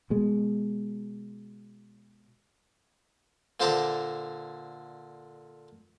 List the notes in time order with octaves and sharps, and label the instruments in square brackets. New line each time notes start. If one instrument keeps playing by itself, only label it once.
[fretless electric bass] B2 G#3
[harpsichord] A#2 D3 C5 A5 A#5 D6